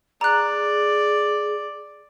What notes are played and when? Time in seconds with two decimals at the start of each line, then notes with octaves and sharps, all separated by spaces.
0.21 G#4 D5 A#5 F#6